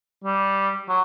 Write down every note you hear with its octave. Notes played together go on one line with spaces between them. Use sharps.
G3
F#3